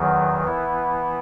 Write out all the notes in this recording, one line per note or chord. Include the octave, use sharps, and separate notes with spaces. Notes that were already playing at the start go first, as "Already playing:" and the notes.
Already playing: E2 D#3 F#3
E3 B3 E4